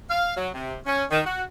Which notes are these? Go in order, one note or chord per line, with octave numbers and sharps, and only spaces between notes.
F5
F#3
C3
C#4
D#3
F#4